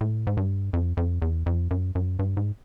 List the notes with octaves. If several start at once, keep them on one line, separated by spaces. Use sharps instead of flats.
A2
G#2
G2
F2
F2
E2
F2
F#2
F#2
G2
G#2